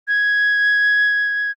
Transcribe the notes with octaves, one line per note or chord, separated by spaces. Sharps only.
G#6